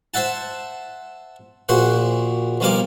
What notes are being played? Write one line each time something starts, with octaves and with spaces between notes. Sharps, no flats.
C5 E5 F#5 A5
A#1 A#2 F#4 C5 F#5
B1 F3 G3 A#3 F5 D6